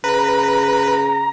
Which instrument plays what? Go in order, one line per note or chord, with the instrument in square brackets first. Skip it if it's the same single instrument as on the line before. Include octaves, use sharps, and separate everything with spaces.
[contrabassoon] C#3 [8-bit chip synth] B4 [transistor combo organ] A#5